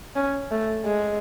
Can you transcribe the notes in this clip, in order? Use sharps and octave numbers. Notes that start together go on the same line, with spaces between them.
C#4
A3
G#3